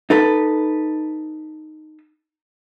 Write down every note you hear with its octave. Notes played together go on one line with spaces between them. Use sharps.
D#4 A4 B4